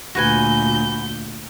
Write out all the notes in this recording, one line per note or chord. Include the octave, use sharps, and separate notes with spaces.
D2 A#2 F#4 B4 G#5 G6